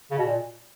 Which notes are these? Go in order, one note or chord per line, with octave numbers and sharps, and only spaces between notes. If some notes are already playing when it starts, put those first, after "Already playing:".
C#3
B2
A#2